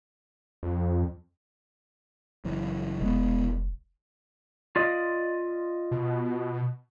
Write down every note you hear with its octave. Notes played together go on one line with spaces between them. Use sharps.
F2
F#1 F#2 E3
F1 B2 G#3 B3
F4 D5 D#5
B2